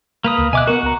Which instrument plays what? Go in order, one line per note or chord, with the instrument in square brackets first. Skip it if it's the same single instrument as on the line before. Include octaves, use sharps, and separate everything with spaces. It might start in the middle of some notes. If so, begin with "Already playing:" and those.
[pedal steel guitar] A#3 B4 D#6
[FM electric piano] D2
[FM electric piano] B2 D#5 E5 [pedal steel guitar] G#5 D6 F#6
[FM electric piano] B3 A#4 [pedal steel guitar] F#4 F#5
[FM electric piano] C#2 A#5